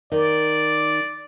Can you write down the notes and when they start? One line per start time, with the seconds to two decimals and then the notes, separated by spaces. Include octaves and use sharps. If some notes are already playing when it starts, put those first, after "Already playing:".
0.12 D#3 D5